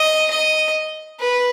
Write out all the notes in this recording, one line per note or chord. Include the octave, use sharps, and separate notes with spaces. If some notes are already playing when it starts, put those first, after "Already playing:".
Already playing: D#5
D#5
B4